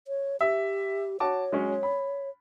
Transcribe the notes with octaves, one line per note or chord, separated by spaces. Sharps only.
C#5
G4 E5
F#4 C#5 A5 D6
F#3 G#3 C#4
B5